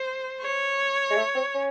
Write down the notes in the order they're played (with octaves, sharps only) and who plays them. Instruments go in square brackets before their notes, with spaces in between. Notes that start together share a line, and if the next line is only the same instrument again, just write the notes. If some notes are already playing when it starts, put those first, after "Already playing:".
Already playing: [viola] C5
C#5
[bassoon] G#3
A3
C4
C#4